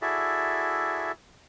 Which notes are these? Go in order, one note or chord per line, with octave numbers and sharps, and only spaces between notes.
E4 F#4 G#4 A4 D5 E5